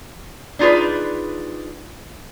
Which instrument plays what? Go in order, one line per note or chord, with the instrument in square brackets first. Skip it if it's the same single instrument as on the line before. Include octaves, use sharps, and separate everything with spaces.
[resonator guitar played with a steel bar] D4 D#4 F4 G#4 B4